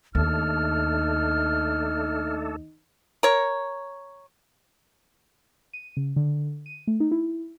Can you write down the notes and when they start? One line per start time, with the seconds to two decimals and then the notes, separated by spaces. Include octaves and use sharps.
0.15 D#2 A3 D4 D#4 A4 F6
3.23 A#4 C#5
5.73 D#7
5.97 C#3
6.16 D3
6.66 D#7
6.87 A3
7.00 D#4
7.11 E4